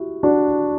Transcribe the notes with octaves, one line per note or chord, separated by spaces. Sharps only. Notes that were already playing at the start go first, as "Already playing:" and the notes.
Already playing: E4 F#4 G4
D4 F#4